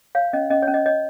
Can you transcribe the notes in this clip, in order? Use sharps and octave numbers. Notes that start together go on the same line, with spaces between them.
C#5 F5
C#4 D#5
C#4 D#5
C#5
C#4
D#5
C#5 D#5